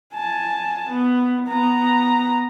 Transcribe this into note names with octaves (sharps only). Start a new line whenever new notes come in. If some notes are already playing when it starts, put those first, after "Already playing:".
G#5 A5
B3
B3 A#5